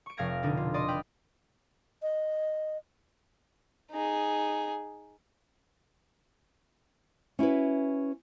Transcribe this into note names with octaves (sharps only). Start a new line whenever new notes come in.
C#6 D7
F1 F5 F6 G#6 A#6 D7
B2 D3 D4 D#4
F4
D5 D#5 C6 D#6
B4 G5 F6
D#5
D#4 G#4
C#4 E4 F#4 B4